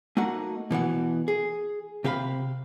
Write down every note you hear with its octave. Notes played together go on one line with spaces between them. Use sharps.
A3 A#3 D#4 F#4 F#5
B2 E3 B3 F#5
G#4
C3 G4 F5 B5